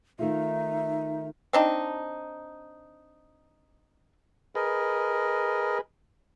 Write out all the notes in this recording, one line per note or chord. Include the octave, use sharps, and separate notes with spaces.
D#3 A3 D#4 F4 E5
C4 D4 D#4
G#4 A#4 B4 D#5